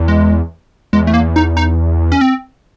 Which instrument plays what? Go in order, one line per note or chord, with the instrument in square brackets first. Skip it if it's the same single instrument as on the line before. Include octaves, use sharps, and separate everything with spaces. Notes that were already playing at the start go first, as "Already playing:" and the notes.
Already playing: [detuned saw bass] E2
[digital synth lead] G#3
[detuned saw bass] E2 [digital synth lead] G#3
[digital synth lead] A3
A#3
D#4
D#4
C#4
C4